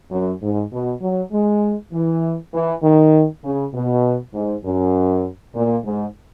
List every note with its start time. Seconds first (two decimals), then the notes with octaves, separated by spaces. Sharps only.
0.10 F#2
0.42 G#2
0.71 B2
1.01 F#3
1.32 G#3
1.92 E3
2.53 E3
2.82 D#3
3.43 C#3
3.73 B2
4.33 G#2
4.63 F#2
5.55 A#2
5.84 G#2